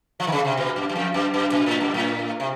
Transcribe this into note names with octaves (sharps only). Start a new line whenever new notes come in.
F3
D#3
C#3
C3
A#2
F#2
F#2
F2
F#2
F#2
A#2
A2
F#2
A2
C3